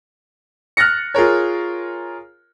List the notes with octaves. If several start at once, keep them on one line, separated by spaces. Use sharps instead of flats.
F6 F#6 A6 A#6 C#7
F4 G#4 A#4 C#5